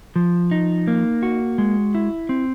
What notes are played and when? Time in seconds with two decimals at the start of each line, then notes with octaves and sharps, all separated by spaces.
0.16 F3
0.51 D#4
0.88 A#3
1.23 F#4
1.58 G#3
1.95 E4
2.29 C4